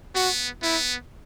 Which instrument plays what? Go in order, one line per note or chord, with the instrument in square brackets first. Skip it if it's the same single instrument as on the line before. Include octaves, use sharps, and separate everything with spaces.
[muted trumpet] B3 [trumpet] F#4
[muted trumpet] B3 [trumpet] E4